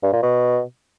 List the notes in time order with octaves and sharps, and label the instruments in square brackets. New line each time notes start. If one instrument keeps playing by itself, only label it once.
[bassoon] G2
A#2
B2